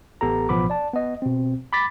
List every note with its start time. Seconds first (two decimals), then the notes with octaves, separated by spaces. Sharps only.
0.21 A1 B3 G4 A4 A#5
0.49 A1 B2 F3 B3 B5 D6
0.70 D5 A5
0.94 B3 D#5
1.22 B2 C4
1.73 B5 D6 A6 B6